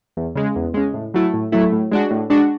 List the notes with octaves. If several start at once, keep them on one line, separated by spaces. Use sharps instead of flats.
E2
C#3 G#3
E2
C#3 G#3
A2
F#3 A3 E4
A2
F#3 A3 E4
A2
G#3 D4 F#4
A2
G#3 D4 F#4